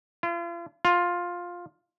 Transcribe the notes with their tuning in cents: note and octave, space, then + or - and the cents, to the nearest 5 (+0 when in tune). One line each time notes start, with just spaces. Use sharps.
F4 -40
F4 +10